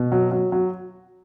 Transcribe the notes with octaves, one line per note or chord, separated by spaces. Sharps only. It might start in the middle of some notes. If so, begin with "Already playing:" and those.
Already playing: B2
F#3
F#3
F#3